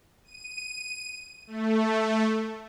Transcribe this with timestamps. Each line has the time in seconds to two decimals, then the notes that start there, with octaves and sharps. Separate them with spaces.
0.25 D#7
1.47 A3